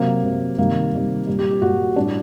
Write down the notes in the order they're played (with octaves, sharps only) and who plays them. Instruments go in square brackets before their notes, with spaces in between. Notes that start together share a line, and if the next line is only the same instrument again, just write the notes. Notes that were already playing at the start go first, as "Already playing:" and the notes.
Already playing: [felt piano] C3 F#3 A#3
C3 F#3
C3 D#3 G3 A#3
C3 D#3 G3
A#2 G3
G4
G4
A#2 G3 F#4
A2 G3 D4